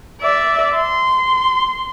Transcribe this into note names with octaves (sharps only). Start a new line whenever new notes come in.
D5 E5
C6